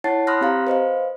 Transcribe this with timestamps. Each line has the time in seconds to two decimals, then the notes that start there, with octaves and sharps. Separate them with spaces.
0.04 E4 C#5 F#5 A5 A6 C7
0.27 B5 C6 D#6 F6 F#6 A#6
0.41 C4 G4 F5 A#5
0.67 B4 C5 D#5 F5